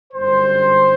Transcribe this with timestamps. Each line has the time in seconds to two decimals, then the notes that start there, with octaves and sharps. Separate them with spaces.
0.13 G1 F#2 D3 G3 C5